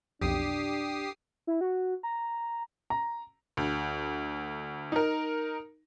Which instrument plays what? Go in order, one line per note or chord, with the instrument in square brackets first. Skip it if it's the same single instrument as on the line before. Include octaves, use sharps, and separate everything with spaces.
[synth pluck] B1 F2 [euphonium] D4 [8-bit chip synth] G4 D#6 C7
[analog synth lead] E4
F#4
A#5
[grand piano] A#5
[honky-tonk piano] D2
D#4 A#4